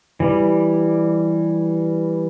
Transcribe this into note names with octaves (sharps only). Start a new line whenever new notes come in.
E3 G3